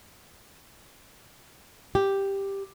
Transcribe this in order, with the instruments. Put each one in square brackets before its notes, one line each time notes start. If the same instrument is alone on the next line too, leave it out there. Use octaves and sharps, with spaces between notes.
[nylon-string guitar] G4